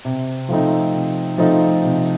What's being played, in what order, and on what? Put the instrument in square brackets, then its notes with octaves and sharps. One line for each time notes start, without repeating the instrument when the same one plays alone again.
[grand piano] C3
F3 A3 C4 D#4
C3
F3 A3 C4 D#4
C3